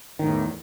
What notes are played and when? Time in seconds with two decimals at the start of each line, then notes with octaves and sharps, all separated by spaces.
0.19 D#3
0.23 A2
0.27 E2